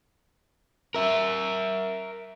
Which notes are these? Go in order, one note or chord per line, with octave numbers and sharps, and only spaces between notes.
A#4 E5